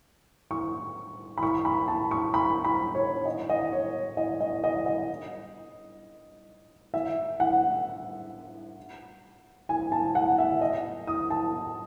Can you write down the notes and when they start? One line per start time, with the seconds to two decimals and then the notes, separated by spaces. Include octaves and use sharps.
0.51 C#6
1.38 B5
1.43 C#6
1.65 B5
1.88 A5
2.11 C#6
2.34 B5
2.64 B5
2.95 C#5
3.26 D#5
3.49 D#5
3.72 C#5
4.17 D#5
4.41 D#5
4.64 D#5
4.86 D#5
6.94 E5
7.40 F#5
9.69 G#5
9.92 A5
10.15 F#5
10.38 E5
10.61 D#5
11.07 D#6
11.30 A5